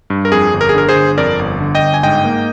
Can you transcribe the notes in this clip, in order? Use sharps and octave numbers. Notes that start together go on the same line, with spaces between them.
G2
A#4
F2 G#4
G1
A#4
G#4
D3 A#4
G#4 C5
G1
F2 A#4 D5
G1
D3
D#5 G5
G1
G#5
G#2 D#5 G5
A#3